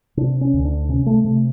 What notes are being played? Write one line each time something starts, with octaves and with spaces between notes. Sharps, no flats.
C3 D4
C#4
D2
D4
C3 C#4
A3
C3 A3